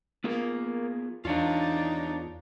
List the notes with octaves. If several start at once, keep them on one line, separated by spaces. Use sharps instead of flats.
A#3 B3 F4 G#4
E2 D4 D#4 F4 C#5 F5